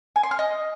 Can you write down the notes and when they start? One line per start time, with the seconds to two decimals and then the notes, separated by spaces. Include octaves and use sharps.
0.16 G#5
0.23 C6
0.31 F6
0.39 D#5